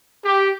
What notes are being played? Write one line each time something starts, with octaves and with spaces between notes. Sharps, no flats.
G4